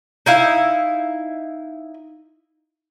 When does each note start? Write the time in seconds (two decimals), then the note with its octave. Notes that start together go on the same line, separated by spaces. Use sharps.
0.26 D#4 E4 F5